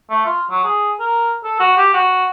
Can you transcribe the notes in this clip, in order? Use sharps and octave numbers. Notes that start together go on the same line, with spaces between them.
A3
F4
F#3
G#4
A#4
A4
F#4
G4
F#4